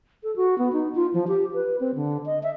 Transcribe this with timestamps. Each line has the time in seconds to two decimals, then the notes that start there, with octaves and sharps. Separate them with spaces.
0.23 A4
0.36 F#4
0.58 B3
0.73 D#4
0.95 F4
1.14 F3
1.28 G4
1.54 B4
1.80 C4
1.95 D3
2.26 D#5
2.43 E5